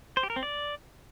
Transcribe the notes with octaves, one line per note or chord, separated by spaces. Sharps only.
C5
G4
A#4
C4
D5